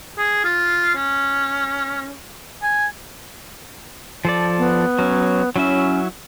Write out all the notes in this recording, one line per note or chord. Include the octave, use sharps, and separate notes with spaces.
G#4
F4
C#4
G#5
F3 A4 D5
B3
F#3 C#4
F#3 C#4 E4 E5